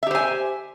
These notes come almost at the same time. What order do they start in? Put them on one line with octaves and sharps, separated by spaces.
E5 G4 C5 G#5